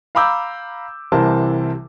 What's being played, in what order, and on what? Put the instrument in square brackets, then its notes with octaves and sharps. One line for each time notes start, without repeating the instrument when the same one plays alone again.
[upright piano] F5 A#5 B5 D6 E6 G6
C2 C3 E3 A#4 C5 A5